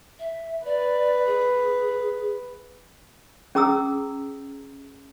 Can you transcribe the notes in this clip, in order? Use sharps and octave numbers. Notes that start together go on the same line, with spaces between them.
E5
B4 D5
G#4
C#4 G#4 A#5 D#6 E6